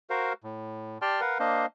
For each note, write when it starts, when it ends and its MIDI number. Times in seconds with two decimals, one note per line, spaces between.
0.10 0.33 66
0.10 0.33 70
0.10 0.33 72
0.10 0.33 77
0.44 0.98 45
1.02 1.21 67
1.02 1.21 74
1.02 1.21 79
1.02 1.21 81
1.02 1.21 84
1.02 1.21 89
1.21 1.38 70
1.21 1.38 71
1.21 1.38 77
1.21 1.38 78
1.40 1.66 58
1.40 1.66 62
1.40 1.66 72
1.40 1.66 75
1.40 1.66 77